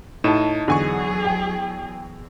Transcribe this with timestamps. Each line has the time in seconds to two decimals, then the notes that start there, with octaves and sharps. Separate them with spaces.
0.24 A2 D#4 A5 E7
0.68 E2 D3 F#3 G#4 G#5 C#6
1.25 G5